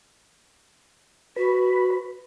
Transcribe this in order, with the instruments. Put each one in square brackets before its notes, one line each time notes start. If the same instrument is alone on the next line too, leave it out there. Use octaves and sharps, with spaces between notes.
[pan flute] F#4 [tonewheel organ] B4 B5